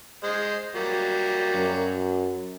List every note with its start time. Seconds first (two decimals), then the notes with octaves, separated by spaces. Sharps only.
0.24 G#3 C5 D#5
0.75 F#3 G3 A#3
1.55 F#2